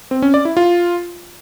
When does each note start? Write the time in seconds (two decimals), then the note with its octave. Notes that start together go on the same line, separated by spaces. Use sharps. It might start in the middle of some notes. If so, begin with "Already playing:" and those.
0.11 C4
0.22 C#4
0.34 D5
0.45 E4
0.57 F4